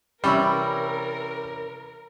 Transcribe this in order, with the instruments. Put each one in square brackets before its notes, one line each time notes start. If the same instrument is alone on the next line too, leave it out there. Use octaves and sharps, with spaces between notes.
[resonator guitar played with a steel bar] C3 E3 C#4 [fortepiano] G3 [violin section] A#4 [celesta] B5 C#6 E6